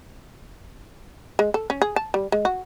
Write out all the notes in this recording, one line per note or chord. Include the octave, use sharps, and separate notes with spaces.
G#3
A4
C#4
G#4
A5
G3
G#3
F#4